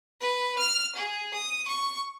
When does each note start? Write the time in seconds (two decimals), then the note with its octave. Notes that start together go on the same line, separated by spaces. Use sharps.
0.21 B4
0.58 F6
0.96 G#4
1.34 D#6
1.68 C#6